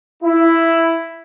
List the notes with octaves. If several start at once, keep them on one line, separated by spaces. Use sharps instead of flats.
E4